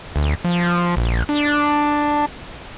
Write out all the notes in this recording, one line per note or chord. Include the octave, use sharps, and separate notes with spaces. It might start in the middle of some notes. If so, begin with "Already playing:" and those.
D2
F3
A#1
D4